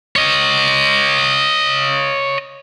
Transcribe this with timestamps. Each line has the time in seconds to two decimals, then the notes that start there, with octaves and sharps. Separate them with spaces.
0.16 C#5 D#5